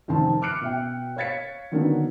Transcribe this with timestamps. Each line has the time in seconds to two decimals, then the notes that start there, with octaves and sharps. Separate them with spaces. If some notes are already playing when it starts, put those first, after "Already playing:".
0.08 F1 D#3 C4 A#4 A5
0.42 D6 F6 F#6 C#7 D7
0.61 B2 E5 G5
1.17 C#5 F5 G#6 A6 B6 C#7
1.72 D3 D#3 F#3 A#3 B3 D4